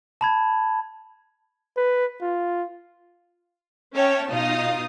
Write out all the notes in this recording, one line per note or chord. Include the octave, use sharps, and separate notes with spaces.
A5 B5 G#6
B4
F4
C#4 C#5 E5 G5 A5
B2 D#4 F4 D#5 F5 D#6